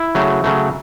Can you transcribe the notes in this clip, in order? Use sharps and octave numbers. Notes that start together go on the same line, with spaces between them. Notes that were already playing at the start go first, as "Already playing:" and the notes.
Already playing: E4
C#3 F#3 A3
C#3 F#3 A3